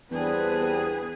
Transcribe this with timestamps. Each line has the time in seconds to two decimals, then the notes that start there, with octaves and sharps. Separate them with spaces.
0.11 E2 G3 B3 C4 D4 G#4 B4